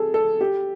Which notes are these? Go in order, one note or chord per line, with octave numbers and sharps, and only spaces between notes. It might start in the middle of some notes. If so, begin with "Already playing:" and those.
Already playing: G#4 A4
A4
G4